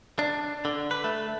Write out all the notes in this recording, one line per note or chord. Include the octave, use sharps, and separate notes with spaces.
D4
D3
B4
A3